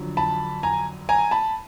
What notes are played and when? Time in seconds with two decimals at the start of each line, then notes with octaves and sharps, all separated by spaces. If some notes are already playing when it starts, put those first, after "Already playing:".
Already playing: F2 D3 F#3
0.17 A5 B5
0.63 G#5 A#5
1.09 G#5 A#5
1.31 A5 B5